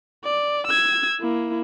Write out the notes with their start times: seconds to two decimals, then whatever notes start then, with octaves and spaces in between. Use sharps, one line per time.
0.24 D5
0.67 E6 G#6
1.21 A#3 E4